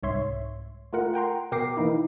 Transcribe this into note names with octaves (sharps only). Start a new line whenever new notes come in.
C2 G#2 C#5 E5 C6
A3 F4 A#4 F#5
F#5 G5 A#5 C6
B2 A#4 G5 D6 A#6 C7
E3 A#3 D#4 E4